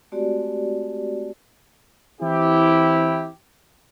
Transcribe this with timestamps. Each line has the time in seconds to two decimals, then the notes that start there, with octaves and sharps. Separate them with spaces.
0.12 G#3 A3 C4 F#4 G4 D5
2.20 E3 C4 E4 G4